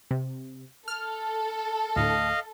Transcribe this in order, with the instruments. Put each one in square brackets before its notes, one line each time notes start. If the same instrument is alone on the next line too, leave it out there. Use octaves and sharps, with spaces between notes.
[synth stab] C3
[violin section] A4 [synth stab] F6
[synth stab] D2 A2 [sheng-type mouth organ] D#5 F5